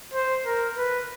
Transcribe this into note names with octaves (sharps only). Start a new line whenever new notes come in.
C5
A#4
B4